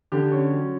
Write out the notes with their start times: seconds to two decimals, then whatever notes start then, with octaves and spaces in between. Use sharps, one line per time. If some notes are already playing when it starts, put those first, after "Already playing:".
0.12 D3 G4
0.31 C#4
0.51 F#3